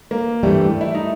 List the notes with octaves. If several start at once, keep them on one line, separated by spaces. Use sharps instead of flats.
A#3
G2 E3 G3 A3
E4
D#4